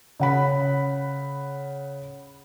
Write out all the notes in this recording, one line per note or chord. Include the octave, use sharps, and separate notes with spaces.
C#3 F#5 B5